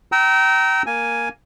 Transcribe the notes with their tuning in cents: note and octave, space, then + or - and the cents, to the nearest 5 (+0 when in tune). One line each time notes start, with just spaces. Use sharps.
G5 -30 A#5 +0 E6 -30
A#3 +0 G#5 +0